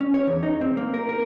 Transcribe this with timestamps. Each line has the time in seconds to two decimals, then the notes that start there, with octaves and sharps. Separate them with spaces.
0.01 C#4
0.14 C#5
0.27 E2
0.43 D#4
0.61 C4
0.77 A#3
0.94 A#4
1.09 A#4